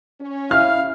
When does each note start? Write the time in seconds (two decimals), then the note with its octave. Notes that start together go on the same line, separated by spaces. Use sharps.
0.20 C#4
0.51 E4 F5 F6